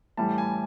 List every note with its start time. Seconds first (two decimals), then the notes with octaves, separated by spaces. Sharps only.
0.17 A2 E3 G3 A5
0.38 G#5